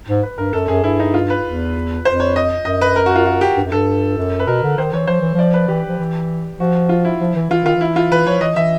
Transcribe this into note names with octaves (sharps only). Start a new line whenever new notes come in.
G#2
B4
G2 A#4
F#2 A4
F#2 G#4
G2 E4
D#4
F4
B4
E2
F2 C5
C#5
D#5
F#2 D#5
B4
A#4
F#4
F4
F#4
G4
G2
F#2
G2 A4
F#2
B4
B2 A#4
D3
D#3 C5
E3 C#5
F3 C5
E3
F3 D5
B4
E3 G4
F3
E3
F3 F#4
F4
E4
F3
E3
E3 F4
D#3 F4
E3 E4
F4
E3 B4
F3 C#5
E3 D#5
E3 E5